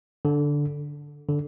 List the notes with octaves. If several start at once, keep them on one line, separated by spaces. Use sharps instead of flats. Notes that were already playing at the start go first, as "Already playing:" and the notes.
D3
D3